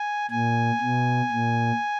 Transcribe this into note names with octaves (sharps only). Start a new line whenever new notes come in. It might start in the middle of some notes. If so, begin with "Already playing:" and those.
Already playing: G#5
A#2 G#5
B2
A#2